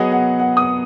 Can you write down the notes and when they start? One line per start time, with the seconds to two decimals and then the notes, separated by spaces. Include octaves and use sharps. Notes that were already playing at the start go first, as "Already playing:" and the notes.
Already playing: F#3 B3 G#4 D#5 F#5
0.12 F#5
0.40 F#5
0.57 D#6